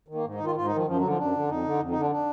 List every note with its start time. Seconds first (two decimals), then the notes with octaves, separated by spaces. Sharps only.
0.08 D#3
0.15 A#3
0.24 G#2
0.35 D#4
0.40 D#3
0.45 F4
0.55 G#2 F4
0.66 D#3 D#4
0.76 F3
0.86 F#2 F3
0.96 D3 F#3
1.07 F3
1.17 F#2 D4
1.34 D3
1.48 F2 D#4
1.64 D3
1.80 F2
1.90 D#4
1.96 D3 D4
2.10 D4